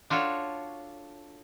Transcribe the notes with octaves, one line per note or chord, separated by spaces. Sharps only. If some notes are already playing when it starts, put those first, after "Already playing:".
D4 F4 F#4 A4 C#5